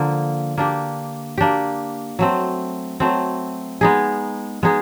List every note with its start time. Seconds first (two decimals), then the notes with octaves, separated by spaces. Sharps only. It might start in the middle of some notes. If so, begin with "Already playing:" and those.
Already playing: D3 F3 A#3
0.58 A#3 D4 G4
1.38 A#3 D4 G4
2.19 F#3 A3 C4
3.00 F#3 A3 C4
3.81 G#3 B3 D#4 G#4
4.63 G#3 B3 D#4 G#4